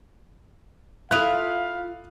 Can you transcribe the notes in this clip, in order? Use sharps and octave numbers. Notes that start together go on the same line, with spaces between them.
E4 F4 A4 F5 D#6 F#6